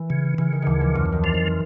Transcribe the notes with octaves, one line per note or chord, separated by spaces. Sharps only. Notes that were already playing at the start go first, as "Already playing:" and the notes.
Already playing: E3
C#3
C#3 E3
D#3
D2 D#3 E3
F3
F2 F#3
D#3
E3 F3